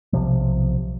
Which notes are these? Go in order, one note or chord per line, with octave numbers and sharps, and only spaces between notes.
B1 C3 F3